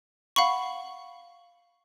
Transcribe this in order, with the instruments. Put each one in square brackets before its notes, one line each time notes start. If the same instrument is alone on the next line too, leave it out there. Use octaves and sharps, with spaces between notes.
[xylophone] F5 F#5 B5 C#6